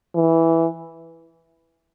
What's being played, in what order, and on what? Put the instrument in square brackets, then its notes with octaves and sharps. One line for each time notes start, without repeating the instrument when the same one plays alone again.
[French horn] E3